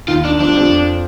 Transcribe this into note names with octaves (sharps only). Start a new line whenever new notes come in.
D#2 D#3 F4
D4
F3 D4
G3
F2 F3